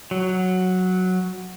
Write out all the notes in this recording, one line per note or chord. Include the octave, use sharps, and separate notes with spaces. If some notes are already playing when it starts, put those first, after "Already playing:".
F#3